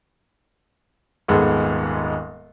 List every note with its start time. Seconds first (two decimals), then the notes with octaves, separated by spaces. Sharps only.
1.28 D#1 G#2 G#3 B3 A4